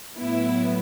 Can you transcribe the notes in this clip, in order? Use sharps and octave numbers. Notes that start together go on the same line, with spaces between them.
A2 F#3 B3 E4